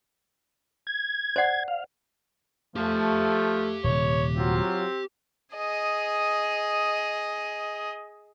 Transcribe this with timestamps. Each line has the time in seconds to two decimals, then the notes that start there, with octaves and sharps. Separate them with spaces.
0.87 G#6
1.36 C5 D5 F#5
1.68 F5
2.76 F3 A3 G4 F5
3.84 D#1 C3 C#5
4.37 F#3 C4 F4 F#4
5.54 G#4 D#5